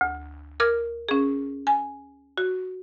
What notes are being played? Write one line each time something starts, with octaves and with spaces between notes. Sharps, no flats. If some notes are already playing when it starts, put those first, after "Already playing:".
D2
A#4 D6 F6 G#6
C#4 G#4
G#5
F#4